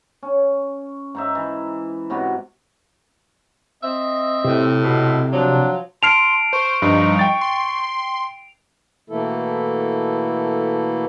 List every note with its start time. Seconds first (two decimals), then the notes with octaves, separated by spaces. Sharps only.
0.23 C#4
1.15 G#2 D#4 E5
1.35 E3
2.10 G#2 C3 B3 F#4
3.83 C4 D#5 E5
4.44 A2 C3
4.83 B2 A4
5.33 F3 F#3 D4
6.03 A5 C6 F6 C7 D7 F7
6.53 C5 C#6
6.82 G2 F3 G3 D#4
7.19 G5 A6
7.41 C6
9.09 B2 E3 A3 A#3 E4 A4